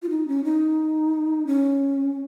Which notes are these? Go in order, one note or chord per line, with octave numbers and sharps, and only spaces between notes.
F4
D#4
C#4
D#4
C#4